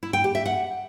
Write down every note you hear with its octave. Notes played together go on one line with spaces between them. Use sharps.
E4
G5
G4
E5
F#5